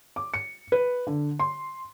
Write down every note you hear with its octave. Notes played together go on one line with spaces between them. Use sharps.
D6
C#7
B4
D3
C6